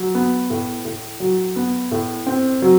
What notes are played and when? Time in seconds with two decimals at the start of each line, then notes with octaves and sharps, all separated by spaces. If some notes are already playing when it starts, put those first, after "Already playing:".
Already playing: F#3
0.15 B3
0.50 A2
0.85 A2
1.20 F#3
1.56 B3
1.91 A2
2.27 C4
2.62 F#3